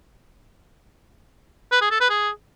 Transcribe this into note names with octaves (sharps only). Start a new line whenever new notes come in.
B4
G#4
A4
B4
G#4